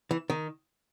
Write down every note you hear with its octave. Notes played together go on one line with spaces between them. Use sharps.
E3
D#3